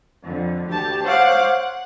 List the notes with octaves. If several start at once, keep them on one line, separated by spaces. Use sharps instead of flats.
F2 D3
D2 G4 A5
C5 C#5 F5 F#5 D6
F#5